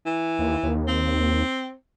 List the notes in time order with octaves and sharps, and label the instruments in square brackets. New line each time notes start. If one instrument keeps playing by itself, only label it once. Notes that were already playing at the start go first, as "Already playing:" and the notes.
[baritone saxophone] E3
[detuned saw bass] D#2
D#2
[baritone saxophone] C4